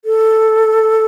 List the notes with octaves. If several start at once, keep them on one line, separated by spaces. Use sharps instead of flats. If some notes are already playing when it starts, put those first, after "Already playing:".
A4